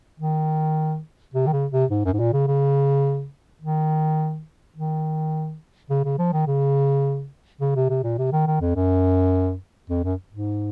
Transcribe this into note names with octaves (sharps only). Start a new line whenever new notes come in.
D#3
C3
D#3
C#3
C3
G#2
F#2
G#2
A#2
C#3
C#3
D#3
D#3
C#3
C#3
F3
D#3
C#3
C#3
C3
C3
A#2
C3
D#3
D#3
F2
F#2
F2
F#2
G#2